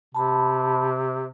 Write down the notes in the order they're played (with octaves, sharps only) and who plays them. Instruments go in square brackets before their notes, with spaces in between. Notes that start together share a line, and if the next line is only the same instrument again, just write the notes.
[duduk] C3 [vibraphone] A5 B5